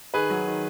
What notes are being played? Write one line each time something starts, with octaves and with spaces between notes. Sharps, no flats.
D#3 G#4 B4
F#3
D#3